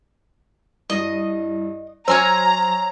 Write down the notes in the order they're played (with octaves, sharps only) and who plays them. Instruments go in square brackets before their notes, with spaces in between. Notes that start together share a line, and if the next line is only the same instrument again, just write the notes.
[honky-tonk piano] G2 A#6 [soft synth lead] E4 [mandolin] D#5
[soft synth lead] F#3 [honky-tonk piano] C5 F6 [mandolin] C#5 G#5 E6 [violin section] A#5